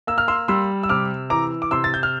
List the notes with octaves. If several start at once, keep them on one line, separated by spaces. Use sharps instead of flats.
A#3 E6
F6
C6 E6
G3 C6 E6
E6
C3 D6 F6
E3 A#5 D6
D6
C3 C6 E6
A6
G6
F6